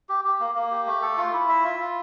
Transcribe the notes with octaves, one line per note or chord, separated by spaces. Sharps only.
G4
G4
A#3
A#3
G4
A3
A4
F4
E4
E5
F4
F4